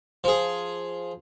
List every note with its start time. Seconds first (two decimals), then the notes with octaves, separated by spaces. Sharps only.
0.24 F3 G#4